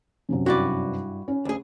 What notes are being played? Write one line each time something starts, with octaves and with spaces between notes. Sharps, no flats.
F#2 C3 F#3
G2 E4 F#4 B4 D5
C#4
D2 G#4